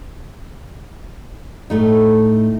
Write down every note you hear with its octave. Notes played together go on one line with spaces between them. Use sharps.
A2 A3 D#4